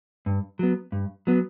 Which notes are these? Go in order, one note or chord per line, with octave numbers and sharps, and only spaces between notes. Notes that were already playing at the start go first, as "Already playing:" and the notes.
G2
F#3 B3
G2
F#3 B3